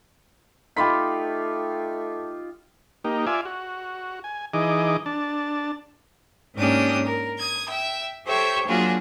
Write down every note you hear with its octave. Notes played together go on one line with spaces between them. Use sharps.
A3 D#4 F4 G4 B5 C6 B6
A#3 D#4 G4
F4 D5 E5 G#5
F#4
G#5
E3 D#4 G#4 D#5 D6
D4 A5
G#2 A#3 C#4 D4 G4 D#6
A#4
D#6 G#6
E5 G5
G4 A4 C5 C#5 E5 G5
F#3 A#3 D4 F4 F#4 G#4